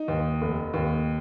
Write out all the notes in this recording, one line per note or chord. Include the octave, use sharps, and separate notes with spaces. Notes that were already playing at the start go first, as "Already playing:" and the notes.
Already playing: D#4
D#2
F1
D#2